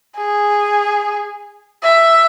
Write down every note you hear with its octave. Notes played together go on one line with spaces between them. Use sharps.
G#4
E5